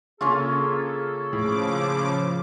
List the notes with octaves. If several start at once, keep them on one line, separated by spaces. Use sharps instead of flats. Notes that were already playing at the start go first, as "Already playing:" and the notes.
C#3 A#3 C#4 F4 G#4 A4
A2 C#3 F3 G#4 D6